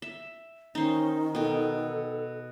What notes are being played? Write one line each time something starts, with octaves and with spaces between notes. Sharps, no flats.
E5
D#3 C#4 D#4 C5
B2 A4 G5